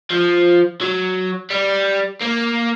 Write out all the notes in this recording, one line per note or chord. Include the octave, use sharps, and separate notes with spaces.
F3
F#3
G3
A#3